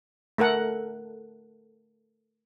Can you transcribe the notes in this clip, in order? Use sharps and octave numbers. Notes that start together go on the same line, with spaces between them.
A3 A4 A#4 F#5